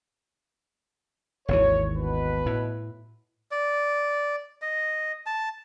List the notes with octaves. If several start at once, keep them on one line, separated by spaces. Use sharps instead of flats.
G#1 D#2 E3 C#5
B2 B4
A2
D5
D#5
A5